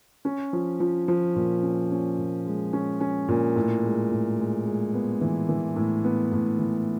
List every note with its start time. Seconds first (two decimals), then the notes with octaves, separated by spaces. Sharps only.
0.25 C#4
0.53 F3
0.80 F3
1.08 F3
1.36 A#2
1.63 C#4
1.91 C#4
2.18 A#2
2.46 G#3
2.73 C#4
3.01 C#4
3.29 A#2
3.56 A2
3.83 G#3
4.11 A2
4.38 G#3
4.66 G#3
4.94 B3
5.21 E3
5.49 E3
5.76 A2
6.04 B3
6.32 A2
6.59 E3